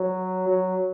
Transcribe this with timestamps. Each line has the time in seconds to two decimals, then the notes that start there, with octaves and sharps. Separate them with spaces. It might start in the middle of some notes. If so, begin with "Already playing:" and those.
Already playing: F#3
0.48 F#3